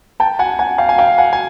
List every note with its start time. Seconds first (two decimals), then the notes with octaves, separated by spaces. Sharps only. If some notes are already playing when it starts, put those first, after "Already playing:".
0.20 G5 A5
0.39 F#5 G#5
0.59 F#5 G#5
0.78 F5 G5
0.89 G#5
0.98 F5 G5
1.18 F#5 G#5
1.33 G#5